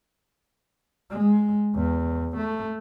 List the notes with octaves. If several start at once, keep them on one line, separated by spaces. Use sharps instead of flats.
G#3
E2
A3